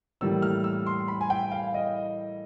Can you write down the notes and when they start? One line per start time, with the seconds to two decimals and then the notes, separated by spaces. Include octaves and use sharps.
0.21 A2 E3 G3 A#3 E6
0.42 F6
0.64 E6
0.86 C6
1.08 B5
1.21 G#5
1.30 G5
1.52 F5
1.74 D#5